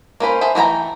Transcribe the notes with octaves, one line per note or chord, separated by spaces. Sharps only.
A#3 C#4 B4 C5
G#4 A4 C5 E5
E3 A3 F#4 G5 A#5